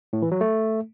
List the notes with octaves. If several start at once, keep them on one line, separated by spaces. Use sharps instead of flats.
A2
E3
F#3
A3